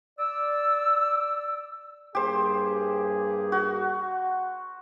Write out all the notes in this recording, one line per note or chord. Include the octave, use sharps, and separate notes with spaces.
D5 E6
G2 A#3 G4 G#4 C5
F#4